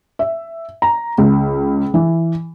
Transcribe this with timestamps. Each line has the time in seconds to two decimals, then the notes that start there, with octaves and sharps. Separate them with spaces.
0.19 E5
0.82 A#5
1.18 C#2
1.94 E3